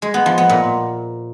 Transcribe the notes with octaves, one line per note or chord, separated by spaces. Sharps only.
G#3
B3
F3
B3
A#2